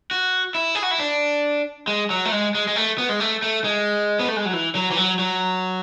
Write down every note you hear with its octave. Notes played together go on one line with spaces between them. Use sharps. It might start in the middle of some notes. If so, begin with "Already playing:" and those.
F#4
E4
G#4
F#4
E4
D4
G#3
F#3
A3
G#3
G#3
G#3
A3
B3
G#3
A3
A3
G#3
B3
A3
G#3
F#3
E3
F#3
E3
F#3
F#3